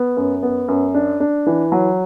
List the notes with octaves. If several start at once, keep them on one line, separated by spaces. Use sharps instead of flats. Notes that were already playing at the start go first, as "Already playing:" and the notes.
Already playing: B3
F#2
B3
F#2
D4
D4
E3
F#3